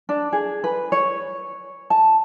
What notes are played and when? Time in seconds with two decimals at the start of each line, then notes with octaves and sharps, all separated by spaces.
0.09 D4
0.33 G#4
0.64 B4
0.92 C#5
1.90 A5